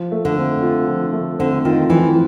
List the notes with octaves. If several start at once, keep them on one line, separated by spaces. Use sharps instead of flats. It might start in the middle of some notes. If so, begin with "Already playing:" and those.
Already playing: F3
A3
D3
C4
F4
F3
A3
D3 C4
D#3 F4
E3 F3